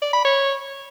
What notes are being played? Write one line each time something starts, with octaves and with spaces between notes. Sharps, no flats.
D5
B5
C#5